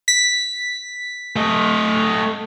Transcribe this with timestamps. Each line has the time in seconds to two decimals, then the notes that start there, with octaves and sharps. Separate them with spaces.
0.08 B6
1.36 A3 D#5